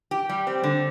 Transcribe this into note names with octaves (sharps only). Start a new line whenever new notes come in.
G4
G3
C4
D3